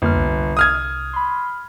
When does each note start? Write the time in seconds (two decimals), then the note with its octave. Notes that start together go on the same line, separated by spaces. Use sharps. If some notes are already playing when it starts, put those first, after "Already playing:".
0.02 G1 F2 A#3 F6
0.15 C2
0.57 D#6 F6 G#6
1.13 B5 C6